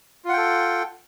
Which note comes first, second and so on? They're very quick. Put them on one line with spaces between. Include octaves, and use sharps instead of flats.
F4 F#5 G5 A4